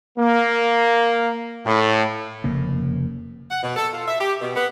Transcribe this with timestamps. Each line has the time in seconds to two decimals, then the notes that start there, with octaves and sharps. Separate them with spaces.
0.18 A#3
1.65 A2
2.44 F1 C#3 A#3
3.50 F#5
3.63 B2
3.76 A4
3.93 F4
4.07 E5
4.19 G4
4.41 B2
4.55 B3